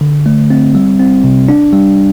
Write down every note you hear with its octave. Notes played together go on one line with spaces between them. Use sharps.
D3
A3
C4
G3
C4
C3
D4
G3